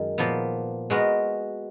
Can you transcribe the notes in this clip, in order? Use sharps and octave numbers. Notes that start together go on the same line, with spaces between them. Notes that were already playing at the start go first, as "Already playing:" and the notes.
Already playing: F#2 D#3 G#3
A#2 F3 B3
G#3 B3 F#4 A#4